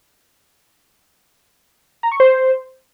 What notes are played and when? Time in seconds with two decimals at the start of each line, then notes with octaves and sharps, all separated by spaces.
2.03 A#5
2.12 C#6
2.20 C5